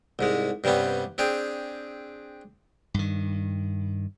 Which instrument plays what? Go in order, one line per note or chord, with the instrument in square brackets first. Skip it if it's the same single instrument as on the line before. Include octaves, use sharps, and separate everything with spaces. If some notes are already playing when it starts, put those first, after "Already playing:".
[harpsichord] C2 G#2 G#3
G2 C3 G3 B3 C#4
C4 D4 G4 G#4
[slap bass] G2 D#3